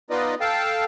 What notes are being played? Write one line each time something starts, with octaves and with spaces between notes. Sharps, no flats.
B3 D#4 F4 B4 D5 D#5
A4 F5 G5 A5